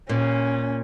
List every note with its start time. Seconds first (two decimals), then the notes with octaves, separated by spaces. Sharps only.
0.09 A#2 C#4